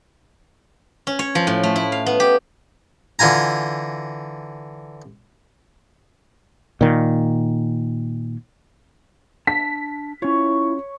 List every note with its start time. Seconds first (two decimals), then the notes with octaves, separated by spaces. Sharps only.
1.07 C#4
1.19 C#5
1.35 F3
1.47 A2
1.63 A3
1.76 E4
1.92 F5
2.06 B3
2.20 G4
3.19 D3 E3 F4 G#5 A#5
6.81 A#2 D#3
9.47 D4 A5 B6
10.22 C#4 E4 F4 C#5